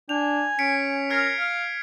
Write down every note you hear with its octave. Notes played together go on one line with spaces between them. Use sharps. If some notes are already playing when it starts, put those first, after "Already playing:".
D4 G#5 F7
C#4 B6 C#7 D7
A#4 F6 G#6 C7
F5